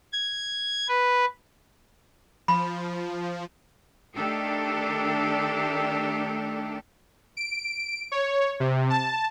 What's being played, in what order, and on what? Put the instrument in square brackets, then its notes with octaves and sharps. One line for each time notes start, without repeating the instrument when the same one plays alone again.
[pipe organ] G#6
B4
[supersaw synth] F3 [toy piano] B5
[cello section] D#3 A3 D4 G4 A4
[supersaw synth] D7
C#5
C3
A5